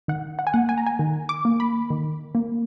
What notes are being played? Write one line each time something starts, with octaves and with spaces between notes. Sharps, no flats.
D#3 F#5
F#5
G#5
A#3 F#5
G#5
A#5
G#5
D#3
D6
A#3
B5
D#3
A#3